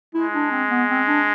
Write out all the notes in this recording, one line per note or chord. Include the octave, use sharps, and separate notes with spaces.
G#3 E4
D4
C4
B3
C4
D4